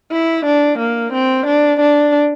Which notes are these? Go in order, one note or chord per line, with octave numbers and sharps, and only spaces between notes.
E4
D4
A#3
C4
D4
D4